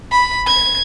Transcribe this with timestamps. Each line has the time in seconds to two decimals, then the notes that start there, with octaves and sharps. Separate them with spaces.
0.12 B5
0.47 G#6